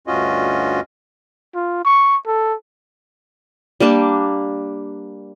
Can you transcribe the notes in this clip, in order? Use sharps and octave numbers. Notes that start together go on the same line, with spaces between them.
D2 G2 C#4 F4 F#4 D#5
F4
C#6
A4
G3 A#3 D4 A5